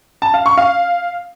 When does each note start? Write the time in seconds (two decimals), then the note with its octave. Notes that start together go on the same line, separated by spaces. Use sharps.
0.22 A5
0.34 F5
0.46 C#6
0.58 F5